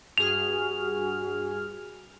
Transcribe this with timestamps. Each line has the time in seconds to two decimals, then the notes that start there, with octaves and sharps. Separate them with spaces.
0.18 G2 F#4 G#4 F6 F7